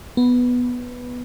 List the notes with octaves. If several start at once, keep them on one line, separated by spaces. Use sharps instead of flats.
B3